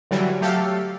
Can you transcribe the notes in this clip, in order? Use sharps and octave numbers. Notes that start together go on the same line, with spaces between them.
D3 E3 F#3 G3
F#3 A3 G4 A4 F5